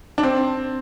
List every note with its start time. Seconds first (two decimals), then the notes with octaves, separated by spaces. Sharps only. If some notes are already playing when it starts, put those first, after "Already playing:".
0.18 D4
0.23 C4